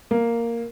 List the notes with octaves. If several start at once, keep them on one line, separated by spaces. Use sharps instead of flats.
A#3